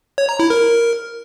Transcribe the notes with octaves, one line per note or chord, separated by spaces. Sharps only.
C#5
A#5
E4
A#4